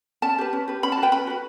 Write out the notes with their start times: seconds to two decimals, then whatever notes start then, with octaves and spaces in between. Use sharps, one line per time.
0.22 C#4 A5
0.38 G4 B4
0.53 C#4
0.68 G4 B4
0.83 C#4 B5
0.92 A5
0.97 F#4
1.02 B4 G5
1.12 C#4 B5
1.27 F#4 B4